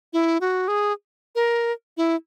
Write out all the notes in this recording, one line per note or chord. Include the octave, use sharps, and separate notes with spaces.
E4
F#4
G#4
A#4
E4